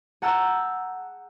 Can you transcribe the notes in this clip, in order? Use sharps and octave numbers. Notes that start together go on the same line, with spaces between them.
G#4 F#5 A5 A#5 E6 G6